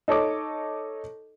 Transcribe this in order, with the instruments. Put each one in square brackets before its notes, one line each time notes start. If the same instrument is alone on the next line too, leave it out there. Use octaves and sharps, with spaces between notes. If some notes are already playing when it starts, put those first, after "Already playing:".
[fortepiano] D#4 A4 C#5 D#5 D6